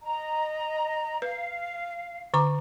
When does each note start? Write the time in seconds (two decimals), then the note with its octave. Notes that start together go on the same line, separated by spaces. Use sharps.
0.01 D#5 A#5
1.22 B4 F5
2.34 D3 A#5 D6